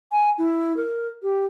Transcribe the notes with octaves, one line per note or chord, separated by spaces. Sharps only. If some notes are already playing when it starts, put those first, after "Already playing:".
G#5
E4
A#4
G4